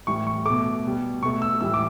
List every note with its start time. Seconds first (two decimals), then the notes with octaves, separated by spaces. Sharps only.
0.07 A2 E3 G3 C#6
0.27 C#6
0.46 B2 A3 D6
0.84 B2 G3
1.23 B2 A3 C#6
1.42 E6
1.61 A2 E3 G3 E6
1.74 D6